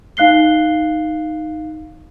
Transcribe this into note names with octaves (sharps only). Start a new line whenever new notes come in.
D#4 F5 F#6 C7 G7